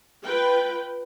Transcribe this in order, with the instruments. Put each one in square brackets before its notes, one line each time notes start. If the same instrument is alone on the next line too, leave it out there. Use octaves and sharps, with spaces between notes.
[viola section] F4 B4 G5